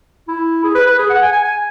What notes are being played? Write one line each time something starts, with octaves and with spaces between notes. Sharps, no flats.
E4
G#4
B4
B4
G#4
F#5
G#5
G#5
G#5